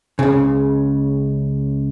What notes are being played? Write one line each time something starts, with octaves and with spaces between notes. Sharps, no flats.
C#2 C#3